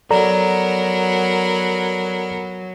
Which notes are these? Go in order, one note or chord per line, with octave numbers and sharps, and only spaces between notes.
F#3 B3 A4 A#4 D5 A#5